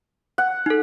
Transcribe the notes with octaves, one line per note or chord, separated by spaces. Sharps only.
F#5
D#4 A4